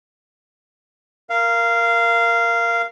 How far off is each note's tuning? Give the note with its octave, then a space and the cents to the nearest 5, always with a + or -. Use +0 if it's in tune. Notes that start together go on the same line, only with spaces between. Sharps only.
A#4 +0 F5 -15